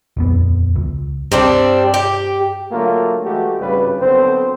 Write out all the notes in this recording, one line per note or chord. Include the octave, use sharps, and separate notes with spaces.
D#1 F2 B3
C#2
G2 G3 C4 D4
G4
D3 F#3 A3 A#3 F4 A#4
E3 G#3 A3 F#4 G4
G#1 C#2 G2 C#3 G3 B4
B1 B2 D3 C4 C5